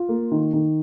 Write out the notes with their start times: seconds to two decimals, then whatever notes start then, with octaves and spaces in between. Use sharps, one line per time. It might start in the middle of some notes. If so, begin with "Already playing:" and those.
Already playing: F4
0.09 A#3
0.32 D#3
0.53 D#3